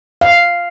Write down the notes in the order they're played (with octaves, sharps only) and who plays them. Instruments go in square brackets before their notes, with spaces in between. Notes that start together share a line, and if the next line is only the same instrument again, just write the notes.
[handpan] F5